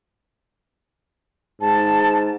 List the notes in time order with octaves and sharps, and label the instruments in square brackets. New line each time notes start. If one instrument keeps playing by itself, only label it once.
[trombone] G#2 [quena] A5